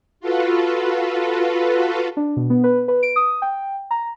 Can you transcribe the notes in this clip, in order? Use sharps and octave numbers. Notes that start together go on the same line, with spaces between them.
F4 F#4 A4 B4
D4
B2
B3
B4
B4
D7
D#6
G5
A#5